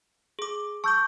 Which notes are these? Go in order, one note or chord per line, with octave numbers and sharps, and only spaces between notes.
G#4 D6
A5 C#6 D6 E6 G6